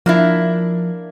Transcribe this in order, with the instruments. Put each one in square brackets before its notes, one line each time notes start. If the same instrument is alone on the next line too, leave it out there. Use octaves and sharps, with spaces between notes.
[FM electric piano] F3 [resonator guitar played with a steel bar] A#3 D4 E4